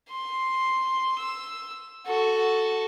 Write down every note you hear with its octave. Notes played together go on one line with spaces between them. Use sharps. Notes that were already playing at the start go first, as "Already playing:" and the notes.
C6
E6
F#4 A4